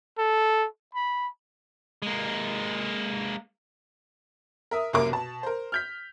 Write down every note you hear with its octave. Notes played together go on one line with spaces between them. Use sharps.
A4
B5
G#3 A#3
A#4 E5 D#6
C2 F#2 A#3 A#4 D6
B2 A5
A#4 C5
F6 G6 B6